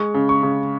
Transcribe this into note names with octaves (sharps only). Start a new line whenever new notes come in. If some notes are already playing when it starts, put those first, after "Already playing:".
Already playing: G#3 C#6
C#3
C#6
C#3